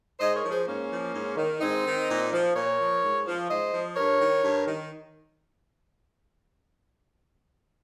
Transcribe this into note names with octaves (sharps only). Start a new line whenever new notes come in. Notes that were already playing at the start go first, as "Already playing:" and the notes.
G#2 C5 D#5
A#4 C#5
F3
G#4 C5
G#2 A#3 C#4
F3
G#2
D#3
G#2 C4 D#4
D#3
A#2
F3
A#2 A#4 C#5
F3
G#2
F3
G#2 C5 D#5
F3
G2 A#4 C#5
D#3
G2
D#3